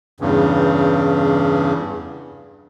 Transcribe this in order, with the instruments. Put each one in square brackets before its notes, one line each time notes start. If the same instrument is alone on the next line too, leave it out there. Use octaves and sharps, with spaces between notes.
[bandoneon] E2 G2 C#3